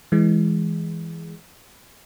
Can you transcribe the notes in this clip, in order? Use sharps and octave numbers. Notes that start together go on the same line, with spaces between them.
E3 G#3